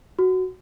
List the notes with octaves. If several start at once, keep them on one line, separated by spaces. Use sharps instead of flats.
F#4